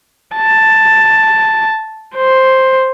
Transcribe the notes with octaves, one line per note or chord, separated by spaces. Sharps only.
A5
C5